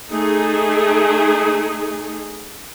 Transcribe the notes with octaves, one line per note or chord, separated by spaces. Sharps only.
A3 D#4 G#4